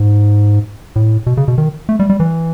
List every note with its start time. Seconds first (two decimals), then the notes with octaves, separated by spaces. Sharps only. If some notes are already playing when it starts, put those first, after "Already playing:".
Already playing: G#2
0.96 A2
1.27 B2
1.37 C#3
1.48 B2
1.58 D#3
1.89 A3
2.00 G3
2.10 G3
2.20 E3